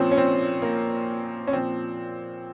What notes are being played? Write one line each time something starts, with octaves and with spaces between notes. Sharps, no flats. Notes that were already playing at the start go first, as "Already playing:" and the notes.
Already playing: A#2 F3 C4 C#4
C#4
C4
A#3
C#4
A#2 F3 C4